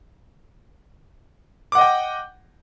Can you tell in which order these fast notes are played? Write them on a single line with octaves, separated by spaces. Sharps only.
D6 F#5 D#5 G5